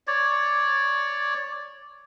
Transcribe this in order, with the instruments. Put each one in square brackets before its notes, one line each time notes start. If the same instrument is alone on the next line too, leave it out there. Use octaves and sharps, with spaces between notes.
[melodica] C#5 D5